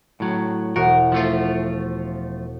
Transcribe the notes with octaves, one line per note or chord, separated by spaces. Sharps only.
A2 F#3
E1 F#4 A#4 C#7
F3 A3 F4